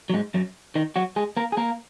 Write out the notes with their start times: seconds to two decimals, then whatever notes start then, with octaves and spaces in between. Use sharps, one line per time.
0.10 F#3
0.14 G#2 G#3
0.34 F#2 F#3
0.75 D#3 D#4
0.96 F#3 F#4
1.16 G#3 G#4
1.37 A#3 A#4
1.52 G#4
1.57 A#3 A#4